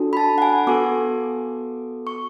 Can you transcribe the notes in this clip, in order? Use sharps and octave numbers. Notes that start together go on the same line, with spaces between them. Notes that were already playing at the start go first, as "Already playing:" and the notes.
Already playing: D4 F#4 A4
B5
A5
F#5
G#5
B3 F#4 A4 D6
C#6